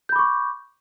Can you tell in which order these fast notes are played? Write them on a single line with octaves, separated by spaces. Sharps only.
G6 B5 D6 C#6